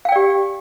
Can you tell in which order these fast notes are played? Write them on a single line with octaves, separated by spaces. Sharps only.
F5 G5 D5 G4